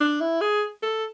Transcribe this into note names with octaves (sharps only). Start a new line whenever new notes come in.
D4
E4
G#4
A4